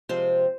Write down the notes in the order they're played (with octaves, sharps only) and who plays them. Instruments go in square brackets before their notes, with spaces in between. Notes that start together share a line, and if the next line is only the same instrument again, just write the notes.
[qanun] C3 F3 G#3 C4 C5